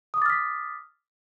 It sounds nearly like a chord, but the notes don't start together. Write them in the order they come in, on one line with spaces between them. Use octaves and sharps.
D#6 D6 A6 F6 B6